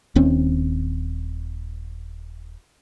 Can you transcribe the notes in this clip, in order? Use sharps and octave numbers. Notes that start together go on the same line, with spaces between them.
D#1 D#2 C4 C#4